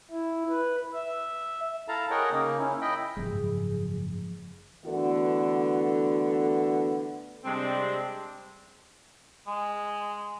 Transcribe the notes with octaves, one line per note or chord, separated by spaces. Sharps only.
E4
B4
E5
E4 A4 F5 A5 A#5
G#4 A#4 C#5 D#5 F#5 G5
C#3 A#3 D#4
C#4 E4
E4 D#5 G5 B5
F#1 G#2 F3 G#3 G#4
D3 E3 A3 B3 F#4
C3 G3 G#3 C4 D4
G#3